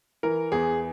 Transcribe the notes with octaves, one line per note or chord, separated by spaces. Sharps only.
E3 A#4
E2 G#4